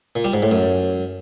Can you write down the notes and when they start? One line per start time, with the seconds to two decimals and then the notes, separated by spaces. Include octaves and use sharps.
0.16 A#2
0.25 G3
0.33 G#2
0.42 A2
0.51 F#2